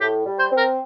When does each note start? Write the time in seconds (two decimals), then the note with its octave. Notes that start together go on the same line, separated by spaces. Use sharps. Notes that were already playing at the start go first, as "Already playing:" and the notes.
0.01 A2 G4
0.26 G3
0.39 C5
0.51 C4
0.57 A#4